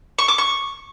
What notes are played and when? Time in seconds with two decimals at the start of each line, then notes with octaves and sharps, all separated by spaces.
0.19 C#6
0.28 D6
0.38 C#6